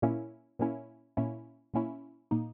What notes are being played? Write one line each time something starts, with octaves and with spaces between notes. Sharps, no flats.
A#2 A#3 C#4 E4
A#2 A#3 C#4 E4
A#2 A#3 C#4 E4
A#2 A#3 C#4 E4
A#2 A#3 D#4